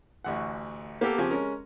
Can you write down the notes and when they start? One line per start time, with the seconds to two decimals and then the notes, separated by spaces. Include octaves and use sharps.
0.24 A1 D2 F#5
1.01 A#3 B3 G4 A4
1.18 C#3 F3 C4 G4 G#5
1.30 G#3 C#4 A#4